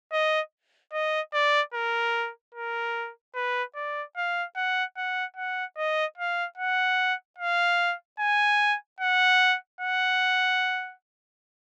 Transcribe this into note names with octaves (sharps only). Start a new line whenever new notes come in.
D#5
D#5
D5
A#4
A#4
B4
D5
F5
F#5
F#5
F#5
D#5
F5
F#5
F5
G#5
F#5
F#5